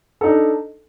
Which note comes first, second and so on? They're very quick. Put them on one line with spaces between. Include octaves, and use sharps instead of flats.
A4 D#4 D4